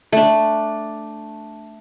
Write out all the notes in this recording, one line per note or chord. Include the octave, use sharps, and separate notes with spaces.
A3 D4